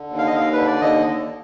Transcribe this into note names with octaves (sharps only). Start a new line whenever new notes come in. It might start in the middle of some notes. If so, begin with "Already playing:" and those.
Already playing: D3
D#2
F5
D#5
D#2 F5
D3 B4
D5
D#2 D#5
D#2